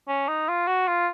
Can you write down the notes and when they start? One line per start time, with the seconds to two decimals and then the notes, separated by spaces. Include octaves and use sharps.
0.08 C#4
0.28 D#4
0.49 F4
0.68 F#4
0.88 F4